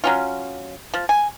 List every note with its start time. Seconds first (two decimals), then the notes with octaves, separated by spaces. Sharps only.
0.04 F#3 C#4 F4
0.94 F3
1.09 G#5